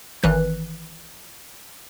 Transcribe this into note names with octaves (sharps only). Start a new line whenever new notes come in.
G#1 E3 F#6